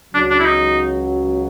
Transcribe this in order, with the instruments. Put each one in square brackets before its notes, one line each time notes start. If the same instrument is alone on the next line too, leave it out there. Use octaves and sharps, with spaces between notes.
[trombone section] C#2 C#3 F#3 [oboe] D4
[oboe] D4
E4
D#4